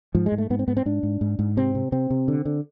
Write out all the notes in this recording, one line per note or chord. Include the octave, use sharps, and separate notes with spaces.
G#2 F3
G#3
G#2
A3
G#2 B3
C4
G#2 B3
C4
G#2 D4
G#2
G#2
G#2
C3 C4
C3
C3 C4
C3
D3
D3